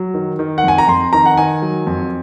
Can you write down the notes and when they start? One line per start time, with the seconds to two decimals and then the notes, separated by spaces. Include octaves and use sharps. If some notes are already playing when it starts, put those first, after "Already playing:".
Already playing: F#3
0.14 D#3
0.39 D#3
0.58 F#5
0.63 F2 G#5
0.78 A#5
0.88 F2 C6
1.13 D#3 A#5
1.26 F#5
1.37 D#3 G#5
1.62 F#3
1.86 F2